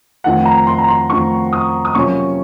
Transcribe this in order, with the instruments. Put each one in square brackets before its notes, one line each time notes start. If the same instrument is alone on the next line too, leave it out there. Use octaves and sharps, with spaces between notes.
[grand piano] F2 D#3 A3 C4 F4 F#5
A#5
C6
A#5
C6
F2 D#3 A3 C4 F4 C#6
D#6
D#6
C3 F#3 A#3 C#4 F4 C#6